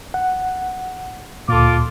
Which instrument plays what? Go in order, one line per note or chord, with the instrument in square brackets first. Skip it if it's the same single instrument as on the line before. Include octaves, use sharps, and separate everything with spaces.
[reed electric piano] F#5
[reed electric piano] D2 A#2 [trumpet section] F4 A4 D6